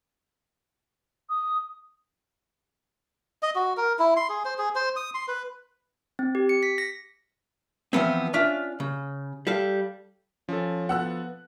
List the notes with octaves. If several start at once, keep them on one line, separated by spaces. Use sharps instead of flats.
D#6
D#5
F#4
A#4
E4
C6
G#4
C5
G#4
C5
D#6
C6
B4
C4
G4
C#7
B6
A#6
E3 F3 B3 C4
C#4 D4 F4 E5
C#3
G3 A4 F5
F3 C#4 A4
B3 F#5 E6 F#6